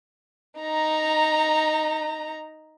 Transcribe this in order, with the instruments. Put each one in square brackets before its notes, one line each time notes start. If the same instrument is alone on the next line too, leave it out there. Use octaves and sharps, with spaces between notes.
[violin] D#4 A#5